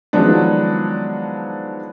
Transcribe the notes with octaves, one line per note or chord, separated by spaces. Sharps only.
D#3 F3 F#3 G#3 B3 D4